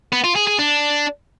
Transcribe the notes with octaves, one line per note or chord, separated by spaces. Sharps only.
B3
F4
G#4
G#4
D4